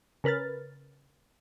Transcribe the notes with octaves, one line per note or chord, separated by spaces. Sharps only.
C#3 A#4 B4 F6 A6